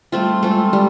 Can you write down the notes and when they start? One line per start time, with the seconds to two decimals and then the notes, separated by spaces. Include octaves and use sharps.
0.12 G3 A3 C4 F4
0.43 G#3 A3 C4 F4
0.73 G3